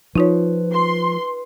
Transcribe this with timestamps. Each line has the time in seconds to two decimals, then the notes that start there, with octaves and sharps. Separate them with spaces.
0.15 F3 D#4 F4 B4 C#5
0.73 C6